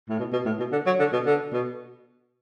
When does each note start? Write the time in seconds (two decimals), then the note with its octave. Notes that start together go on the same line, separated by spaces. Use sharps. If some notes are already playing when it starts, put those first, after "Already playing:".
0.09 A2
0.19 B2
0.33 B2
0.46 A2
0.59 B2
0.72 D3
0.86 F#3
1.00 D3
1.13 B2
1.26 D3
1.53 B2